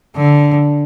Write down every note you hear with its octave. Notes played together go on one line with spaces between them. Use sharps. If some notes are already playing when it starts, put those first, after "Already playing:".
D3